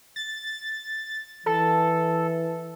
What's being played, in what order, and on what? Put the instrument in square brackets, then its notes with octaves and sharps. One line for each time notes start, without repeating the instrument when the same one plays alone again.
[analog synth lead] A6
[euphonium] E3 [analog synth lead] A4